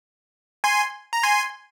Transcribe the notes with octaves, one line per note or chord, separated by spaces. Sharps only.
G#5 C6
A#5
G#5 C6